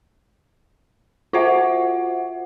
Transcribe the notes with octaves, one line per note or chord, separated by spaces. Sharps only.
F4 F#4 C5 E5 F#5